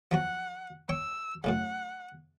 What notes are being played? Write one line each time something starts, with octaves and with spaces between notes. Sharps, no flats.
F3 F#3 F#4 F#5
C#5 G5 E6
F#2 A2 C#3 F#5